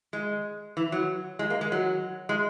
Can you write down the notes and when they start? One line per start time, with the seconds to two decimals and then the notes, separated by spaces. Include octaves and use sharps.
0.13 G#3
0.77 E3
0.92 F#3
1.39 G#3
1.50 A#3
1.61 G#3
1.72 F#3
2.29 G#3